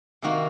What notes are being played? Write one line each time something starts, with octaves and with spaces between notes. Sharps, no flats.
C3 D#3 A#3 F#4